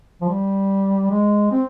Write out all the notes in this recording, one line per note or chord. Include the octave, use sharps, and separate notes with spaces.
F3
G3
G#3
C4